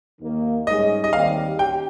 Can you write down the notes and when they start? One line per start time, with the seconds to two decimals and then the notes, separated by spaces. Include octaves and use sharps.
0.21 D#2 D#3 A#3
0.66 G#2 G3 C#4 G#4 D#5
1.04 D#5
1.13 D#2 D#3 G3 C4 G4 F5
1.59 C#4 G4 G5